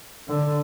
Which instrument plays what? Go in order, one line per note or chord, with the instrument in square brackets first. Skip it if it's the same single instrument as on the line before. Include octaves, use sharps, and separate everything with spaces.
[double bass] D3